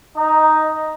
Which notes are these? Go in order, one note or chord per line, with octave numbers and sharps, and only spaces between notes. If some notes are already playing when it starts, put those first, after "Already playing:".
D#4